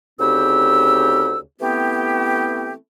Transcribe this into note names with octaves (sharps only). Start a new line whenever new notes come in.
D2 C#3 C4 D#4 G4 E6
E3 A3 B3 C4 E4 G4